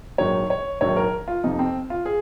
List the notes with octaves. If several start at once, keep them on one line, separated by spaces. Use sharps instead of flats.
A#1 G#2 D#3 F#3 C#5
C#5
A#1 G#2 D#3 F#3 C#5
A#4
F4
F2 C3 F3 D#4
C4
F4
G#4